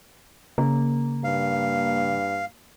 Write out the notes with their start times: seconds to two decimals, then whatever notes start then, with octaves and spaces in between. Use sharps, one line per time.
0.58 C#3 A#3
1.24 G2 F5